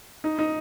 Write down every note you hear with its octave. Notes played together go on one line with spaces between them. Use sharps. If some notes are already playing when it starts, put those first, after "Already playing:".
D#4
D#4